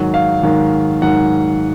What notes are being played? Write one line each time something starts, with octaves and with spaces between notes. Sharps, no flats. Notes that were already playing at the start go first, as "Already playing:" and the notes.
Already playing: G#2 D#3 F#3
F5
G#2 D#3 F#3
G#2 D#3 F#3 F#5